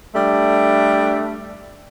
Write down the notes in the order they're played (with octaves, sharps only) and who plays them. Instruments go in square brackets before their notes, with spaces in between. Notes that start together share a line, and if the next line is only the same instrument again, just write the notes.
[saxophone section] G3 A3 D4